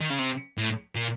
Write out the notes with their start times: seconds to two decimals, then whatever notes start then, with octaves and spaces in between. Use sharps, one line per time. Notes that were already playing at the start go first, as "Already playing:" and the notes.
0.01 D#3
0.10 C#3
0.19 C3
0.58 A2
0.95 A#2